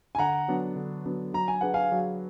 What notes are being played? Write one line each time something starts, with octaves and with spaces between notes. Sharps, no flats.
G#5
D3 F#5 A#5
F#3 B3 D4
D3
F#3 B3 D4
F#3 A#5
G#5
D4 G#4 B4 F#5
F5 G#5
F#3